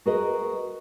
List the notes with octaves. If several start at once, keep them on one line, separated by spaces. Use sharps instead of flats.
F#4 G#4 A#4 B4 D#5